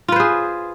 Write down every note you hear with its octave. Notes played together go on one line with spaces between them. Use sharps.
F4 G#4 B4 C5